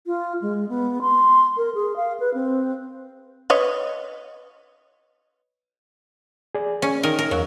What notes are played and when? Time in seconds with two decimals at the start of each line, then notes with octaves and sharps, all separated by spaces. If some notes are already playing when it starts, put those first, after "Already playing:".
0.07 F4
0.42 G#3
0.69 B3
1.01 C6
1.57 A#4
1.75 G#4
1.96 F5
2.20 B4
2.34 C4
3.50 B4 C#5 D#5
6.55 G#4 D5
6.82 C#4
7.03 D#3 A#4
7.19 A#4
7.31 E2 F#3 F5